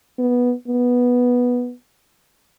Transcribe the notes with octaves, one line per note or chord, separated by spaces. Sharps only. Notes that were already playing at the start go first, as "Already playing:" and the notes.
B3
B3